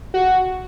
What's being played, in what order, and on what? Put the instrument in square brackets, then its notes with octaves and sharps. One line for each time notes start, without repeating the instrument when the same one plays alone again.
[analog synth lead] F#4